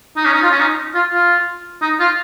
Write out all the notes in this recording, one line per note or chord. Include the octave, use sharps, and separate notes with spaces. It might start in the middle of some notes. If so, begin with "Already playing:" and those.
D#4
C#4
D#4
F4
C#4
D#4
F4
F4
D#4
F4